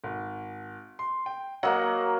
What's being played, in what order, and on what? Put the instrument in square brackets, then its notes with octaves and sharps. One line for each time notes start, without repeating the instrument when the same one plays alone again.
[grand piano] G#1
C6
G5
[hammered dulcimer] F#3 A#3 [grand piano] D#5 F5 F#5